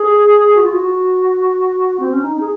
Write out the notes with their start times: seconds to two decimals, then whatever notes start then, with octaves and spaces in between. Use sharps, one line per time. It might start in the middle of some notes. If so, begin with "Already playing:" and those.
Already playing: G#4
0.56 F#4
0.64 F4
0.73 F#4
2.00 C4
2.11 C#4
2.22 D#4
2.40 G#4